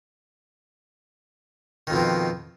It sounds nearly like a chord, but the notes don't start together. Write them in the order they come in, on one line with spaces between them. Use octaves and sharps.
D#3 F2 B2 F3